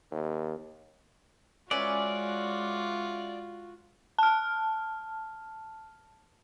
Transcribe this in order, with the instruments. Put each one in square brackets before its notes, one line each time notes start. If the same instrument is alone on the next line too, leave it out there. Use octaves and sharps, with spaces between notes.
[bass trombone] D#2
[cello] G#3 [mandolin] C#4 B4 E5 [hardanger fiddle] F4 F#4 [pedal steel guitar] D5
[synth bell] A5 F6